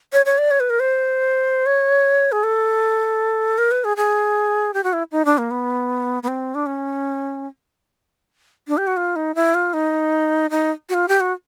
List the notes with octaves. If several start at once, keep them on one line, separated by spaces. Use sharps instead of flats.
C#5
C#5
D5
C#5
B4
A#4
C5
C#5
G#4
A4
A#4
B4
G#4
G#4
G4
F#4
E4
D#4
D4
A#3
B3
B3
C4
D4
C#4
D4
G4
F#4
F4
D#4
E4
F4
D#4
D#4
F#4
F4
G4
F#4